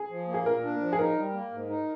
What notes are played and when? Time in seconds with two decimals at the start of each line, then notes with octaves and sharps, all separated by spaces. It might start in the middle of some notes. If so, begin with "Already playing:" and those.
Already playing: G#4
0.11 F3
0.28 A#3
0.34 G#4
0.46 A#2 A#4
0.64 D4
0.81 F3
0.92 G#4
0.98 D#4 A#4
1.17 G3
1.34 A#3
1.52 G#2
1.70 D#4